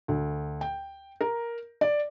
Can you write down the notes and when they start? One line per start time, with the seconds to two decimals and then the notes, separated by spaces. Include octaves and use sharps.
0.08 D2
0.61 G5
1.21 A#4
1.81 D5